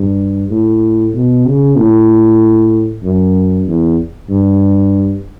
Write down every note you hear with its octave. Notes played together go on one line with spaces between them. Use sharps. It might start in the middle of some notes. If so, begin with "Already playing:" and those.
Already playing: G2
A2
B2
C#3
A2
F#2
E2
G2